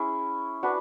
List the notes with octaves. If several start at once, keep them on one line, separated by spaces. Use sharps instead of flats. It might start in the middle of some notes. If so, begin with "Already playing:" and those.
Already playing: C#4 E4 G#4
D4 F#4 B4